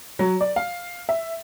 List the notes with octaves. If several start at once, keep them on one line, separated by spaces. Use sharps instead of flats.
F#3
D5
F5
E5